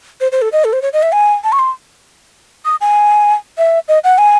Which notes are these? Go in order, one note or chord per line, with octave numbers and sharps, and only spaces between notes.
C5
C5
A4
D#5
A4
C5
C#5
D#5
E5
G#5
A5
C#6
C6
D#6
G#5
E5
D#5
F#5
G#5